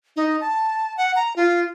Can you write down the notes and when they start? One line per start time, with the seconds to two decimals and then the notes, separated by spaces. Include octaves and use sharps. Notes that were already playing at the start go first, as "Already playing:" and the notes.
0.16 D#4
0.41 A5
0.97 F#5
1.16 A#5
1.36 F4